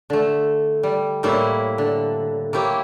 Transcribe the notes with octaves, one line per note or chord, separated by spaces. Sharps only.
D3 A3
G3
A2 G3 A#3 E4 C#5 E5
D3
A#3 E4 G4 C#5